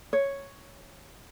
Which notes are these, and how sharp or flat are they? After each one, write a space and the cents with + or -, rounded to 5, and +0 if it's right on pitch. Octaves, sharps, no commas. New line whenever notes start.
C#5 +0